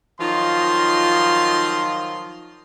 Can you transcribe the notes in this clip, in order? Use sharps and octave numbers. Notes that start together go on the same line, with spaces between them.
D#3 F3 F#3 F4 D#5 C6